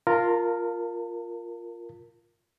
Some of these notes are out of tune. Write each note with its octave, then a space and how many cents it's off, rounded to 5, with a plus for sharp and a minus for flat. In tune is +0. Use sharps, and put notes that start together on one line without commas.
F4 +0 A#4 +0 A5 +35